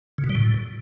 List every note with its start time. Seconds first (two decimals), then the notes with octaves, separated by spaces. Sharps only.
0.18 C#3
0.24 B2
0.29 G3
0.35 A2